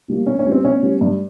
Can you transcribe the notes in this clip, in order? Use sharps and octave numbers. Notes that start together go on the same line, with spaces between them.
B2 G3 A#3
B2 C#4
C#4
G3 B3
C4
B2 C#4
G3 B3
G2